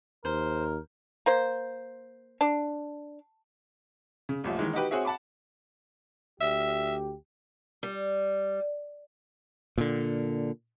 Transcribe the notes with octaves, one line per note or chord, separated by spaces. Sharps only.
D#2 A#4 C5
A#3 C5
D4
C#3
D#1 A1 F3 E5
D#3 E3 G#3
D#4 F#4 G4 B4
C4 F#4 G#4 C#5 E5
F#5 A5 B5 D6
D2 G4 E5
G3
A#2 D3